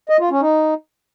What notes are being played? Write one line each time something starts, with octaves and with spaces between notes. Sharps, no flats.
D#5
F4
C#4
D#4